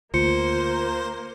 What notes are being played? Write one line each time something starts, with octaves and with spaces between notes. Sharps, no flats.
D2 A#3 F4 C5 C#7